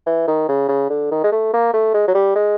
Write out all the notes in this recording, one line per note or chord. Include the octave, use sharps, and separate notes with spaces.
E3
D#3
C#3
C#3
D3
D#3
G#3
A3
A#3
A3
G#3
F#3
G3
G#3